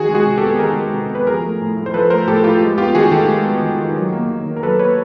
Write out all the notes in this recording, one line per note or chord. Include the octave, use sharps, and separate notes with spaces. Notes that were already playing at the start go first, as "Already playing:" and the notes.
Already playing: D#3 F#4 G#4
G#3
F#4 G#4
C3
G4 A4
B3
D#3 G#4 A#4
G#3
C3
B3 B4
F3 G#4 A#4
A3
A2
A2
C5
F3 A4 B4
A3 A#4 C5
A2 G4 A4
A2 F4 G4
G#3
B3 F4 G4
D#3 F#4 G#4
D#3 G4 A4
G#3
B3
D#3
D#3
F#3
A#3
D#3
D#3
A#4
F#3 A4 B4
A#3 B4 C#5